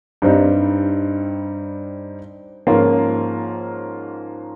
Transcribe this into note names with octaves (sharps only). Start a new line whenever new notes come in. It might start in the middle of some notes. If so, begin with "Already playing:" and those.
G2 G3 C4 D#4
G#2 F3 A#3 C#4 F4